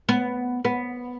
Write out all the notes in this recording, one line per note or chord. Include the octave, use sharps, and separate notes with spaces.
B3
B3